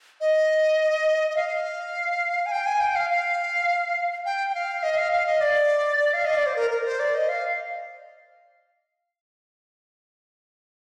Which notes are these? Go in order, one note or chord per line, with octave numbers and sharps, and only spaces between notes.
D#5
D#5
F5
G#5
G5
G#5
G5
F5
F5
G5
G5
F5
D#5
F5
F5
D#5
D5
F5
D#5
D5
C5
A#4
A#4
A#4
C5
D5
D#5
F5